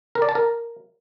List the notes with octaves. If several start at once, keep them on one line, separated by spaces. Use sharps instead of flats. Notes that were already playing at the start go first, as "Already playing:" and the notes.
A#4
D5
A5
A#4